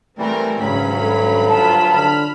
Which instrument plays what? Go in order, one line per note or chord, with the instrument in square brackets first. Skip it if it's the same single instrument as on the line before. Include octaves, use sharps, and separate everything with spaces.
[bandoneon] E3 G3 [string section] A3 C4 A#4
[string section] G#1 C#4 B5 [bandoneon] D2 G2 F#3 [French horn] C#3
[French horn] A4
[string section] F4 B4 B5 [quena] A5
[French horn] D3 [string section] B5 F6